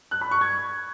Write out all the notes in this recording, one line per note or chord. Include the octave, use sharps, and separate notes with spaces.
F#6
B5
C#6
G#6